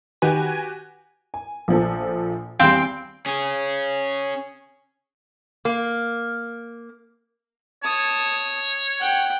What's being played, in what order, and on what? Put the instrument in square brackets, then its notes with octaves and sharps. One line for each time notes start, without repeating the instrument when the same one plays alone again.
[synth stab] D#3 B4 [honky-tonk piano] F#4 G4 [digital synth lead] G#5
[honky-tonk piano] G#5
A#1 F3 A4
[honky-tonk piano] E2 G3 [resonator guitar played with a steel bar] C4 F5 G5
[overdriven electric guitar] C#4 G#4
[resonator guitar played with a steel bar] A#3
[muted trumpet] C#5 [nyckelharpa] A5 D#6
[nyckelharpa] F#5 G5